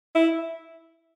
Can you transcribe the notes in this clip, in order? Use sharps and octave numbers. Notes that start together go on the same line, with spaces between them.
E4